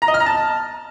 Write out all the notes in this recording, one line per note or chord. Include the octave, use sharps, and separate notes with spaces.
A#5
D#5
F6
A#5
A5